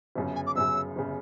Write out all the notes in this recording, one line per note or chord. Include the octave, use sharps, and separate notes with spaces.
G1 F#2 C#3
G#5
D6
G1 F#2 C#3 E6
G1 C#3